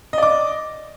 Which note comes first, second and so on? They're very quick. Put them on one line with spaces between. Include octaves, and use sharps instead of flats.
D#5 D5 D6